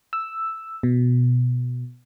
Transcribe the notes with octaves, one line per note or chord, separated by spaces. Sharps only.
E6
B2